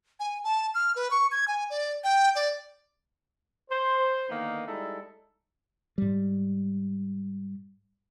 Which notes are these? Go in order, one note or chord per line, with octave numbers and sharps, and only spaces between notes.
G#5
A5
F6
B4
C#6
G#6
G#5
D5
G5
D5
C5
D3 D#3 A#3 B3 D#4 A#4
G3 G#3 D#4 E4 A4
G#2 G3